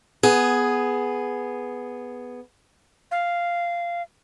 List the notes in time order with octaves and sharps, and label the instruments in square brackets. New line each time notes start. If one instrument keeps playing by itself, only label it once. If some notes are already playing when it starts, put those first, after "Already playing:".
[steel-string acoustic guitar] B3 G#4
[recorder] F5